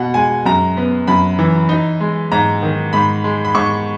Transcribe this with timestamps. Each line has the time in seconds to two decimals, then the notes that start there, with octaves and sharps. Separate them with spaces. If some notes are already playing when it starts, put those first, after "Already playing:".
Already playing: B2 F#5
0.14 G#3 G#5
0.46 F#2 A#5
0.77 B3
1.08 F#2 B5
1.39 E3
1.69 D#4
2.01 G#3
2.32 G#2 A#5
2.62 D#3
2.93 G#2 B5
3.24 G#3
3.45 B5
3.55 G#2 C#6